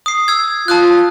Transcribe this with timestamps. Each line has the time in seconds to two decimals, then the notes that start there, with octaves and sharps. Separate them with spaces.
0.06 D#6 C7
0.28 E6 G#6
0.68 F4 A5 D#6 F#6